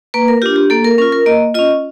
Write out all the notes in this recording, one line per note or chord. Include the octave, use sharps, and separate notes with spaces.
A#3 B4
A#4
D4 F4 G4
G4
A#3 A4
A#4
C#4 F4 A#4
A#4
A#3 D#5
C#4 F4 D#5